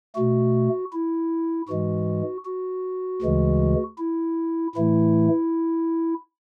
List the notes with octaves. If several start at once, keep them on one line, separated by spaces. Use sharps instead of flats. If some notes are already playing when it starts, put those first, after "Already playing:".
B2 A3 F#4
E4
G#2 E3 G#3 F#4
F#4
D2 C#3 E3 G#3
E4
A2 E3 A3 E4